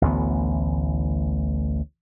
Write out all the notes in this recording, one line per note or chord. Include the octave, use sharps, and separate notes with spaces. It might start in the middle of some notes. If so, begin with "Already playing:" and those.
A1 D2 E3 B3